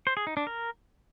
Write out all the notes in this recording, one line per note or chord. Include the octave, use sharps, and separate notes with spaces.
C5
G#4
D#4
D4
A#4